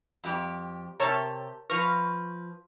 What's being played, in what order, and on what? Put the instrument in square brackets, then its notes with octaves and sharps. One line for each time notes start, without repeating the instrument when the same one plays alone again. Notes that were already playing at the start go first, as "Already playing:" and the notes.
[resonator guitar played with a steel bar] F2 G3 G4
[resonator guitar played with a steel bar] C3 G4 [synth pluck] A#4 C#5 A5
[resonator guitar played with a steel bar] F3 B4 [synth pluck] C#6 F6 A#6